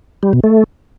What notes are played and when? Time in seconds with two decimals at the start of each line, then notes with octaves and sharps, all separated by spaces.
0.23 G3
0.33 B2
0.44 A3